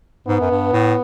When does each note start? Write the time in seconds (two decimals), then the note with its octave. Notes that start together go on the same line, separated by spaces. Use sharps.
0.27 G#2 B3
0.41 F#2
0.51 G2
0.73 A2